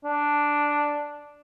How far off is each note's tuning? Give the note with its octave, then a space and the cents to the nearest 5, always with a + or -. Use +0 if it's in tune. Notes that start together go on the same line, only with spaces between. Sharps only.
D4 +0